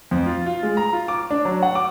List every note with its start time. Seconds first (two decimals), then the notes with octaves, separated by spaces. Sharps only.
0.11 F2
0.26 F4
0.46 F4
0.63 G#3
0.77 A#5
0.93 F4
1.08 D6
1.30 D4
1.45 F#3
1.62 F#5
1.75 D6